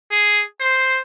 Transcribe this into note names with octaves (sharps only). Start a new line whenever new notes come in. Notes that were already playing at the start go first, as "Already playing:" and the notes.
G#4
C5